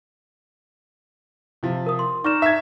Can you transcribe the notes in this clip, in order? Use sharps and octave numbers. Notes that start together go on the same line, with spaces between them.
C3 F3
A#4 D#6
C6
D#4 D5 C#6 F6 E7
E5 G#6